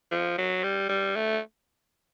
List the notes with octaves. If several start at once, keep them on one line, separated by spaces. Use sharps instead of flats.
F3
F#3
G3
G3
A3